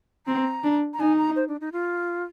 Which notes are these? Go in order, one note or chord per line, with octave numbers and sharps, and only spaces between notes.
C4 A#5
D4
A#5
D#4 G#5
A#5
C5
D4
D#4
F4